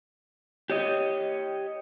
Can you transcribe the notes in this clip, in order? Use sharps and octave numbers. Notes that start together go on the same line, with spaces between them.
G4 C#5 D#5